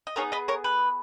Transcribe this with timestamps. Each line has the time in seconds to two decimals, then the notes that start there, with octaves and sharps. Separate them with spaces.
0.07 D#5
0.16 B3 D#4 G#4 A#4 C#5
0.32 B4 D#5
0.48 A#4 C#5
0.64 B4